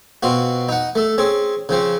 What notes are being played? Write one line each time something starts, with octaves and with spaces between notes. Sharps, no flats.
B2 C4 F4 F#4
D#4 F#5
A3 A4
C4 C#4 G#4
C#3 F3 C4 C#4